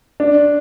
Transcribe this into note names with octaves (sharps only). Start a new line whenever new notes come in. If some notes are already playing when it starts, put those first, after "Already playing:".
D4